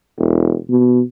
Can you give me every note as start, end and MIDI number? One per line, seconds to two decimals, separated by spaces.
0.19 0.56 28
0.70 1.01 47